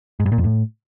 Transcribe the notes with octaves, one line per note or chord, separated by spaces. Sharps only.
G#2
G2
A#2
F2
A2